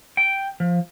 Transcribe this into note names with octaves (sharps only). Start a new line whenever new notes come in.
G5
F3